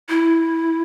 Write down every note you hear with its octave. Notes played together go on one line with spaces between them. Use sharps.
E4